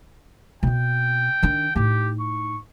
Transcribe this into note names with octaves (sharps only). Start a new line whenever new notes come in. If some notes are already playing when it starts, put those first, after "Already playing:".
B2 C4 G5
D#3 D4
A2 D#4 G4
C#6